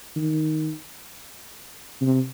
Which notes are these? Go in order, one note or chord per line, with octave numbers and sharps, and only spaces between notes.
D#3
C3